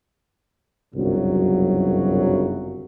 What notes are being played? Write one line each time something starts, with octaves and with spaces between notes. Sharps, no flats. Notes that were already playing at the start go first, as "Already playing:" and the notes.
G1 C2 F#2 C#3 F#3